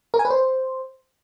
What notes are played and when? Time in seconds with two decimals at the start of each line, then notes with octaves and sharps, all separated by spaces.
0.14 A#4
0.19 G#5
0.25 B4
0.30 C5